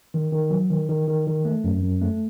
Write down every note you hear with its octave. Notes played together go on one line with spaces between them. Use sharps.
D#3
D#3
F#3
D#3
D#3
D#3
D#3
A3
F#2
F#2
A3